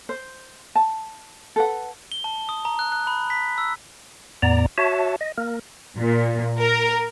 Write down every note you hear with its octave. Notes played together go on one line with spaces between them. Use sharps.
C5
A5
A4 B4 F#5
G7
A5
D#6
A#5
F#6
F#6
B5
B6
E6
E2 A2 B3 D5 A#5
F#4 C#5 E5 A5
D#5
A#3 A#4
A#2
A#4